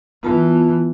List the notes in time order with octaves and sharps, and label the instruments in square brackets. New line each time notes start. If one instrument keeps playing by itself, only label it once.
[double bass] E3 [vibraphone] B3 F4 A5